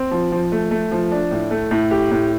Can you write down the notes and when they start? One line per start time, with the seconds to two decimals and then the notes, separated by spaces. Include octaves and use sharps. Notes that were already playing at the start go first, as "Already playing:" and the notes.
Already playing: C4
0.11 F3
0.32 F3
0.52 A3
0.71 A3
0.91 F3
1.12 D4
1.31 A2
1.51 A3
1.71 A2
1.91 G4
2.11 A2